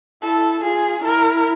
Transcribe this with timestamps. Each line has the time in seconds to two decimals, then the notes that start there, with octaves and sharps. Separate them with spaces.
0.23 E4 A4
0.63 F4 G#4
1.03 E4 A#4